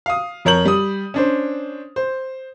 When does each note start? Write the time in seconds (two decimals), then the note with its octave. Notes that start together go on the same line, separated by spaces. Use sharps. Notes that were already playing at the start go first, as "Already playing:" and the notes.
0.06 F5 D#6
0.45 F2 A#4 C#5 A#5 G6 F#7
0.65 G3 D#6
1.14 C#4 D4 C5
1.96 C5